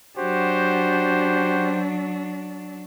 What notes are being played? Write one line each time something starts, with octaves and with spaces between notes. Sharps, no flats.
F#3 D4 F#4 G4 C5